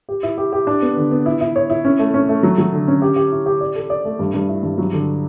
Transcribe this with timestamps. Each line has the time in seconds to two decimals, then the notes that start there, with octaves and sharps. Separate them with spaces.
0.09 G4
0.23 E4
0.38 G4
0.53 G4
0.67 D4
0.82 B3
0.97 D3
1.11 B3
1.26 E4
1.41 E4
1.56 C#5
1.70 E4
1.85 C#4
1.99 A3
2.14 C#4
2.29 A3
2.43 F#3
2.58 F#3
2.73 D3
2.88 C#4
3.02 G4
3.16 G4
3.32 E4
3.46 G4
3.61 D5
3.76 A4
3.90 D5
4.05 A3
4.19 G2
4.34 G2
4.49 E4
4.63 G2
4.78 F#3
4.93 D3